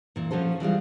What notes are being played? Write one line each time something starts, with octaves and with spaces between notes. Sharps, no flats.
A#2 E3
F3 C#4 F#4 A4 C5
E3 G3 G#3 F4